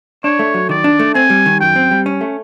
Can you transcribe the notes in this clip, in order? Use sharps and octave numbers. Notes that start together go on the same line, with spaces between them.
D4 C#5
A3
F#3
D#3 D5
D4
A3
C4 G#5
G3
D#3
F#2 G5
C4
G3
C#4
A3